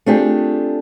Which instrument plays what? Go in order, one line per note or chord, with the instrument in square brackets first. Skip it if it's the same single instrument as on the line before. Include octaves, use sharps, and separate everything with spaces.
[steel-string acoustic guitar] A3 C4 D4 F4 G4 G#4